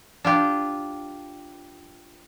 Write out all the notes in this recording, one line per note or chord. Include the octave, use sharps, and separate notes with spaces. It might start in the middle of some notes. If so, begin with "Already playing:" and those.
D4 F4 G4